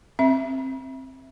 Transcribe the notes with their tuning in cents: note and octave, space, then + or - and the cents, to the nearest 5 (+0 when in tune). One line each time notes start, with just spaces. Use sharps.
C4 +15 E5 +0